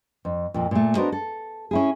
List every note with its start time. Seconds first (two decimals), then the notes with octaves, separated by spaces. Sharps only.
0.25 F2
0.54 F2 A#2 F3
0.71 A#2 A3
0.96 B3 D4 F#4 A#4 C5 D#5
1.12 A4
1.71 C#4 E4 G#4